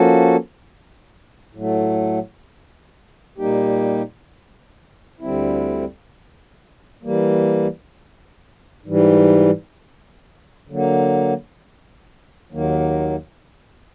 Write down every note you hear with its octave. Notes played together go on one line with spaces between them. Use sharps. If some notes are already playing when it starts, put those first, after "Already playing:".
Already playing: F3 A#3 C#4 F#4 A4
A2 F#3 A3
A#2 G3 A#3 D#4 G4
D2 D3 G3 C4 E4
E3 G3 A#3
G#2 E3 G3
D3 F#3 A#3
D#2 D#3 F#3 A#3